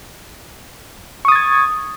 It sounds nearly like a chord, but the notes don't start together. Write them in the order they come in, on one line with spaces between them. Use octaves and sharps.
C#6 D#6 A6 G#6